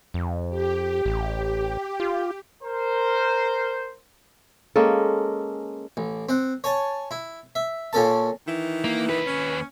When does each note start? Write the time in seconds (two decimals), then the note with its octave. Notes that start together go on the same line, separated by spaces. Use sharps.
0.14 F2
0.50 G4
1.06 A1
2.00 F4
2.63 A#4 C5
4.76 G#3 A#3 C#4 A4
5.97 A1
6.29 C4 F#5
6.64 C#5 G#5 A5
7.11 E4
7.55 E5
7.93 A#2 C#4 A4 A5
8.47 D#3 E3
8.84 A#3
9.10 D#2 B4
9.25 C#4